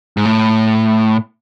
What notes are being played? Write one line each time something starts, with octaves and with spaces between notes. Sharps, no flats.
G#2
A2